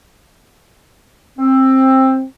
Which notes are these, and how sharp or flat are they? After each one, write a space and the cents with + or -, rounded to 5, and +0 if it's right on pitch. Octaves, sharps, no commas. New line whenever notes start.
C4 +15